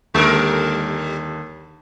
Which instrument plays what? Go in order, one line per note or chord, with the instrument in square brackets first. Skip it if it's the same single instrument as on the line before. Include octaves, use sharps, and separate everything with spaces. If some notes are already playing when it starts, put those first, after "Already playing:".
[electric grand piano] D#2 D3 [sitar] G3 A#4